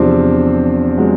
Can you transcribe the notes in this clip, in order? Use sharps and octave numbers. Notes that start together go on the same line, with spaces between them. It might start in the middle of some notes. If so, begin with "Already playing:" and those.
Already playing: E2 C3 F3 C4 D4
F#3 G#3